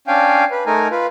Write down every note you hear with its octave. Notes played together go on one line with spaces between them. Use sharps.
C#4 D4 F5 G5 G#5
B4
A3 D#4 A#4 G#5
F4 B4